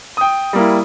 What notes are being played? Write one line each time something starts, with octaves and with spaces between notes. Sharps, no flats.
G5 D#6
G3 A#3 E4